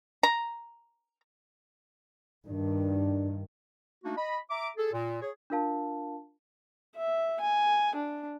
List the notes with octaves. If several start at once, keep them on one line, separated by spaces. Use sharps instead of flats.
A#5
G2 D#3 D4
A3 A#3 D4 D#4 F#4
D#5 B5
E5 A#5 D6
G#4 A4
A#2
G#4 C#5
D4 F4 A#4 F5 A5
E5
G#5
D4